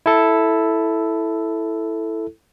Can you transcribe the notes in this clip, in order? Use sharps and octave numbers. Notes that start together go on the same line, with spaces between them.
E4 A4